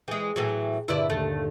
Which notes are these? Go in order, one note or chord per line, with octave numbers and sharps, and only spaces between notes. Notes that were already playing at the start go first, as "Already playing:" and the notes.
E3 G#3 G#4 G5
A2 E3 F#3
G2 A#2 D3 E4 B4 D5
D#2 A3